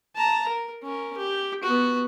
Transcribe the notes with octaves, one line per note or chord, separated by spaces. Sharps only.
A5 A#5
A#4
C#4 A#4
G4
B3 F#4